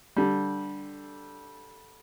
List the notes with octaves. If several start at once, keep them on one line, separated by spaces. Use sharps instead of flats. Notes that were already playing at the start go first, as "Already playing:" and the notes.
D3 G3